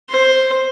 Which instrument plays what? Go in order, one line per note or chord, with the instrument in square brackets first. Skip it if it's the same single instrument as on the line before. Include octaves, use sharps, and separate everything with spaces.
[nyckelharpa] C5